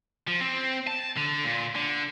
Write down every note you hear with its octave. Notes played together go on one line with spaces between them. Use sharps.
F3
C4
A5
D3
A#2
D3